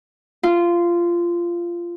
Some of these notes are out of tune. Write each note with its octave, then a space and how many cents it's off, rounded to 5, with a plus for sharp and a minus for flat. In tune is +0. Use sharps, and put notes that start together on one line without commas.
F4 -15